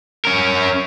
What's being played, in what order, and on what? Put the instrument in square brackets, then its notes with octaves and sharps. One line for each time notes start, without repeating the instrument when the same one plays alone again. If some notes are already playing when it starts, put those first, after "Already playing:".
[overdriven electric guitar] C#4 A#4